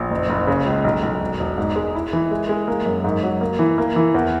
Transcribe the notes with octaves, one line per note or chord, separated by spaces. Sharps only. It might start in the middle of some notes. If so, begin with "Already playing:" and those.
Already playing: A#1
F#1
F#1
C#3
C#2
B1
B1
E1
E1
G#2
G#3
E4
E3
G#3
G#3
A#3
F#2
G#2
F#3
A#3
E3
A#3
E3
E2